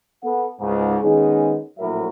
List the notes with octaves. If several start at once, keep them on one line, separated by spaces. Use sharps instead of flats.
B3 A4 F#5
C#2 G#2
D#3 G#3 B3 C#4 D#4 G#4
A#1 A2 F#3 A#4 E5